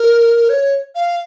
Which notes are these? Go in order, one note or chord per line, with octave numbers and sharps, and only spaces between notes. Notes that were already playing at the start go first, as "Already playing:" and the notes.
Already playing: A#4
C#5
F5